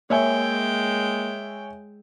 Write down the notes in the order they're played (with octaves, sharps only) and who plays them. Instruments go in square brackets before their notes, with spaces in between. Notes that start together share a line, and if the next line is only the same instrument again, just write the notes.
[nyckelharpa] G#3 G5 [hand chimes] A#3 [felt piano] C#5 E5 G#5